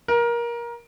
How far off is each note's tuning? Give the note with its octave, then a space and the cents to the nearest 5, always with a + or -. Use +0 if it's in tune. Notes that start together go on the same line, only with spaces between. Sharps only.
A#4 +20